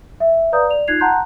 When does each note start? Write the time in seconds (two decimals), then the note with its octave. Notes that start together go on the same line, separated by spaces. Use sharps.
0.20 E5
0.52 B4 D5 F5 A#5 D#6 G6
0.69 D5 F7
0.88 D#4 F4 F#6 G#6 C7 F7
1.00 F#5 A5 A#5 C6 F#6 G6